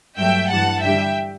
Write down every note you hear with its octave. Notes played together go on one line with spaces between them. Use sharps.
G2 F#3 A3 E5 G5
G2 E3 G3 F#5 A5
G2 D3 G3 E5 G5